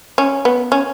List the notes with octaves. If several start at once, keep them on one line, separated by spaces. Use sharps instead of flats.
C#4
B3
C#4